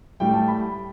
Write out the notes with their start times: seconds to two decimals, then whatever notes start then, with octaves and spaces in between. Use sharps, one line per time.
0.20 A2 G3 G5
0.34 A5
0.48 B5